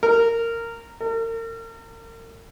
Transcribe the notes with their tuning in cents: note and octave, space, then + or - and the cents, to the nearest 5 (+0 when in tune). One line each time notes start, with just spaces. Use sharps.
A#4 -15
A#4 -40